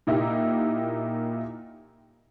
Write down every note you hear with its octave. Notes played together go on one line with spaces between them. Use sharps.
A#2 A#3 D#4 E4 G4